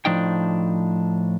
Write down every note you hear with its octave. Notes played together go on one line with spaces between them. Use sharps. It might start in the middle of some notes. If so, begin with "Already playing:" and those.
A2 F3 D4 D#4 G5